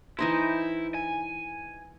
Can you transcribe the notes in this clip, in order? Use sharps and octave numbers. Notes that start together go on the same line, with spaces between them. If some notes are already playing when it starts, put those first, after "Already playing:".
E3 D#4 E4 C5
G#5